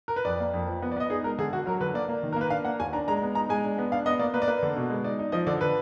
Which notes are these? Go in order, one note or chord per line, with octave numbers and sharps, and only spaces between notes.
A#4
B4
F2 D5
A#3
F2
F3
B3
D5
B3 D#5
D#4 G#4
G#3 A#4
D3 G#4
D3 F#4
F#3 A#4
D3 B4
A#3 D5
A#3
D#3
A#4
A#3 B4
D4 F5
A#3 F#5
D#2 G#5
D4 A#5
G#3 A#5
B3
D#4 A#5
G#3 G#5
D4
B3
D4 F5
B3 D#5
A#3 D5
A#3 B4
D5
A#3 B4
D3
B2
G#3
D#4 D5
D#4
F3 D#5
D3 D5
D3 B4